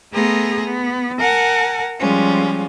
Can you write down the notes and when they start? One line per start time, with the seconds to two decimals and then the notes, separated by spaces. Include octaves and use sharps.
0.12 A3 B3 G#4 A#5 C6 A#6
0.64 B3
1.19 A#4 F#5 G#5 A5
2.00 F3 G3 G#3 C#4 F4